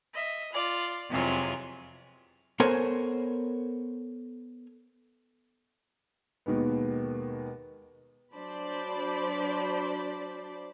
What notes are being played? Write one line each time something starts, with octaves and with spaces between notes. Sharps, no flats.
D#5 E5
F4 D5
F2 C3 E3 F#3 G#3 F4
B3 A4 A#4 C5 C#5 G#5
D#2 B2 D#3 G#3 B3
F#3 D4 C5 D5 A5 B5